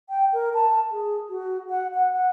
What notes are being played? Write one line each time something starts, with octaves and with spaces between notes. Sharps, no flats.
G5
A#4
A5
G#4
F#4
F#5
F#5
F#5